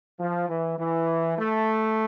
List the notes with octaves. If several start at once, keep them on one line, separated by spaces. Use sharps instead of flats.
F3
E3
E3
A3